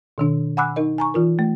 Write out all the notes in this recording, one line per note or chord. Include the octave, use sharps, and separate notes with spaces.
B2 D#3 D4
F#5 G#5 B5 D6 E6 F#6
D#4 A#4 D#5
G#5 A#5 C#6
E3 F4 A#4
A3